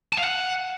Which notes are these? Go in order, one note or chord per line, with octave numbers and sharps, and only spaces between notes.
A5
F5
F#5